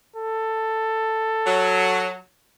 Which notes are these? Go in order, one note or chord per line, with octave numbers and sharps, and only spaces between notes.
A4
F#3